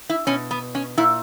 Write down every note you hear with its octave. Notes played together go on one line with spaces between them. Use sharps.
E4
B2 C#4
B3
C#4
A#2 E4